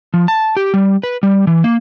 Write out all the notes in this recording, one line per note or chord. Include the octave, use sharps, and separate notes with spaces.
F3
A5
G4
G3
B4
G3
E3
A#3